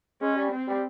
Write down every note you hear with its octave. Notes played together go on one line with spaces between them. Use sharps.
G#3 C#4
G3
C4
G3